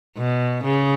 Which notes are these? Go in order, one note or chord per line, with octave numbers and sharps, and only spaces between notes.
B2
C#3